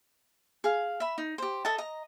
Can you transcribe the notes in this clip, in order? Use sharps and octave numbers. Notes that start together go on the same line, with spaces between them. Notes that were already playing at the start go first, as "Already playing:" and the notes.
G#4 F5
E5 B5
D#4
G4 C5
A4 D#5 E5 A5
D#5 A#5